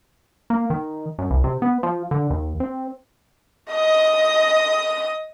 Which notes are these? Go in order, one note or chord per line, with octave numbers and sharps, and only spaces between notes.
A#3
D#3
F#2
C2
C3
B3
F3
D3
D#2
C4
D#5 D#6